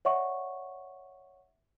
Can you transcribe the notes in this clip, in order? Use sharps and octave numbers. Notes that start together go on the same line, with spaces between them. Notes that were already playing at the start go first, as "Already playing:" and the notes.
C#5 D5 E5 F#5 C#6